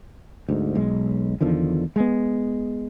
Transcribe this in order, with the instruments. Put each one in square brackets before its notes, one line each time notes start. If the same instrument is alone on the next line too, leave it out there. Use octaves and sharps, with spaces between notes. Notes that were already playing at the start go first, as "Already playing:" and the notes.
[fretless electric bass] D2 G#2
B1 G#3
E2 D3 D#3 F3
G#3 B3